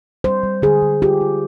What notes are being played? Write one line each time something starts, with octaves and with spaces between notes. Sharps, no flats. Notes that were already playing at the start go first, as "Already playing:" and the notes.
G3 C5
G3
D3 G#4
D3
F4 G4
F4